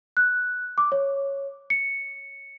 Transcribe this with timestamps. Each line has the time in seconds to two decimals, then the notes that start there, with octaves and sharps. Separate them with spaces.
0.17 F#6
0.78 D6
0.92 C#5
1.70 C#7